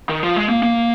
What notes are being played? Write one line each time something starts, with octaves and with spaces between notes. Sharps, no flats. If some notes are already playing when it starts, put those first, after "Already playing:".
D#3
F3
G#3
A#3
A#3